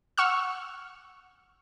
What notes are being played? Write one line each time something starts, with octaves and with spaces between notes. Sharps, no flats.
F#5 C#6 E6 F6